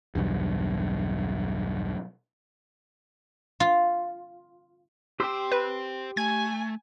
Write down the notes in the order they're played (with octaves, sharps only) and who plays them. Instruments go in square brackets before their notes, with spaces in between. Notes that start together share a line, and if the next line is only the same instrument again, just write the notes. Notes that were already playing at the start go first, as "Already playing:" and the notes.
[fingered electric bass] B1 E2 G2
[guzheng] F4
[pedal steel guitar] G4 C6 E6 [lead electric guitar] C5 G5
[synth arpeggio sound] B4
[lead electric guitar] A3 [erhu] G#5 [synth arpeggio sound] G#6